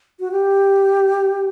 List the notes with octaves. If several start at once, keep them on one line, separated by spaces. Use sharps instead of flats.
F#4
G4